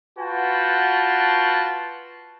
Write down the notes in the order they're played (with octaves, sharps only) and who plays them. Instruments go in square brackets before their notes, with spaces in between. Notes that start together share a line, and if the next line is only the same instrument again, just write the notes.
[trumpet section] F4 F#4 B4 F#5 G5 A5